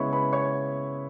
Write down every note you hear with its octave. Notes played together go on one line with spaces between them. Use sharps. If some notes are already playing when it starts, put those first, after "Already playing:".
Already playing: C#3 G#3 B3 E4 C#5 B5 C#6
B4 B5
C#5 C#6